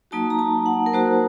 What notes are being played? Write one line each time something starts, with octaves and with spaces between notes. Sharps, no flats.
F#3 A#3 D#4 F#4 A5
A#5
A5
F#5
A#4
F#3 A#3 D#4 F#4 C5